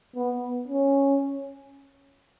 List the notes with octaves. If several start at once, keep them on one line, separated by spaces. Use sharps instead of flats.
B3
C#4